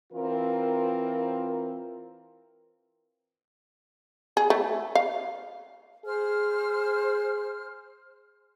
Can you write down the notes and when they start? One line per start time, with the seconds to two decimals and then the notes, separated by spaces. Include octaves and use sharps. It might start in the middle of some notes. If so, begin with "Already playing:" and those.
0.13 E3 C4 F4 A#4
4.37 G#4
4.50 A3
4.95 F5
6.05 G#4 C5 F6